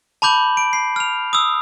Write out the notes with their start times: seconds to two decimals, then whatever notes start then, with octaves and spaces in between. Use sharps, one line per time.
0.22 A5 B5 D6 G6 F#7
0.57 D7
0.73 C7
0.96 F6 F7
1.33 D#6 E6